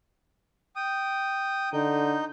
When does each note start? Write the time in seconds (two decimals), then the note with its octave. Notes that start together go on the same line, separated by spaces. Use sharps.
0.76 G5 D#6
1.73 D3 D#4 G6